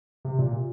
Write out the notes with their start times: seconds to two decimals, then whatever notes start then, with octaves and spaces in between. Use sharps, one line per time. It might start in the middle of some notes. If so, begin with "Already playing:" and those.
0.25 C3
0.39 A#2